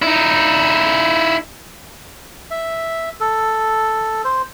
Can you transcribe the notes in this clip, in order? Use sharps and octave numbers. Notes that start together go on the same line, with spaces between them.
D#4 E4
E5
A4
C5